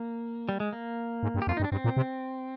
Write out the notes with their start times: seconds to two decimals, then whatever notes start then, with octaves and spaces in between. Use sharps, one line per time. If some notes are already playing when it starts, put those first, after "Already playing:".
Already playing: A#3
0.49 G3
0.60 G#3
0.73 A#3
1.23 G#2
1.35 G2
1.42 G4
1.47 F2 F4
1.57 D#4
1.60 G2
1.64 D4
1.72 G2 C4
1.84 A#2
1.97 C3